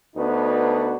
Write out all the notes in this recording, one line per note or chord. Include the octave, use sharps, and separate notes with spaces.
D2 B3 D4 D#4 F#4 B4